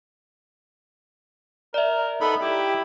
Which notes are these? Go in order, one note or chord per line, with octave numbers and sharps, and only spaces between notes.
A#4 D5 E5
B3 D#4 A4 B5
E4 G4 G5